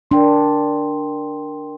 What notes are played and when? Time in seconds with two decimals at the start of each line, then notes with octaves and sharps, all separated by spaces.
0.11 D4 A#4 G5 C6